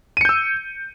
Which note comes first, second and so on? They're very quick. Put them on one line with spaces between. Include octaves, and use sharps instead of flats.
D#7 C#7 G6 E6